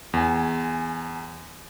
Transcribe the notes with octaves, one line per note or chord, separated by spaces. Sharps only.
E2 G#5